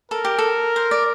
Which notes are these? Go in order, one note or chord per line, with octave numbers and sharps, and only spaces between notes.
A4 A#4
G4
A4
C5
D5